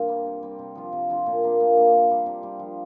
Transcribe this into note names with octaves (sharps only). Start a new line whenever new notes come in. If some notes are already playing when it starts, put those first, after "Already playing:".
Already playing: G2 C3 A#3 F4
G3 C4
C3
G3 C4
C3
F3 D4 F4
C3
F3 D4 F4
A#2
A#3 D4
A#2
A#3 D4
C3
G3 D4
C3
G3 D4
F3